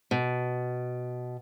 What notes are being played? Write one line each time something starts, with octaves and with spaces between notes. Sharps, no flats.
B2